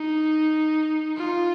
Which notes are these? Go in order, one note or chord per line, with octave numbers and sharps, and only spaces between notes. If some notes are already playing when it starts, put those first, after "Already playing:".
Already playing: D#4
F4